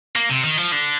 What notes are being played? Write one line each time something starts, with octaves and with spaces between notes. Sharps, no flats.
A#3
C3
D#3
F3
D3